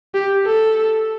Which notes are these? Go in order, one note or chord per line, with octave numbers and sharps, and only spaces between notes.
G4
A4